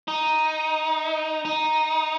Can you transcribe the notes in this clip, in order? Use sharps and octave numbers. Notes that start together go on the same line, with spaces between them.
D#4
D#4